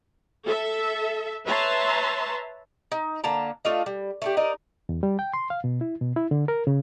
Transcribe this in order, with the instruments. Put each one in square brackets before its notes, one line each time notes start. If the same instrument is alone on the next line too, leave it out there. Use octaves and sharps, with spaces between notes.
[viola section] A4 E5
B4 C#5 E5 A5 A#5 C6
[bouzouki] D#4
D3 A#3 A5 A#5
A3 D4 F4 D#5
G3
A3 D4 G4
D#4 A#4 D5 D#5
[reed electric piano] E2
G3
G5
C6
F5
B2
E4
B2
E4
D3
A#4
C#3